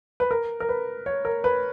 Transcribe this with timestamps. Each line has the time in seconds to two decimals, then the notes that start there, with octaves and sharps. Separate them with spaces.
0.20 B4
0.31 A#4
0.60 A#4
0.69 B4
1.06 C#5
1.25 A#4
1.44 B4